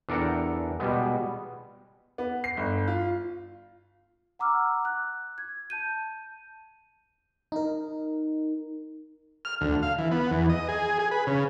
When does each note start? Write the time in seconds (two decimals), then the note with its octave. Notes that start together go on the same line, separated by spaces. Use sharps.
0.09 E2 D4 A4 A#4 F#5 G5
0.80 B2 G3 G#3 B3
2.18 B3
2.44 C7
2.57 G1
2.88 F4
4.39 F#5 A#5 D6 E6 F6
4.85 F#6
5.38 G#6
5.70 A5 G6 D#7
7.52 D#4 A#4
9.45 F6
9.61 D2
9.83 F5
9.98 E3
10.11 B3
10.31 E2
10.50 D#5
10.68 G#4
10.99 G#4
11.11 B4
11.27 C#3